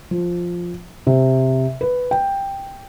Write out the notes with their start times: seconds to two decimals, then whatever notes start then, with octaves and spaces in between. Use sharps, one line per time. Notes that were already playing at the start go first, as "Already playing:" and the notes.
0.11 F3
1.07 C3
1.81 B4
2.11 G5